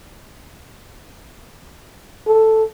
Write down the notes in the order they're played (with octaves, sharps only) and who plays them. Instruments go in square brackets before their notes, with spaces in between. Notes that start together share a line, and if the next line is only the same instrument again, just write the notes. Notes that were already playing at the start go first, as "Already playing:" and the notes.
[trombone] A4